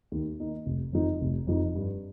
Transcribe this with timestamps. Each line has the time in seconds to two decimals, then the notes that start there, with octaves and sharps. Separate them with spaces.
0.12 D#2
0.40 D#3 A#3 D#4
0.66 F1
0.93 F2 F3 D#4
1.21 F1
1.47 F2 F3 D#4
1.75 G2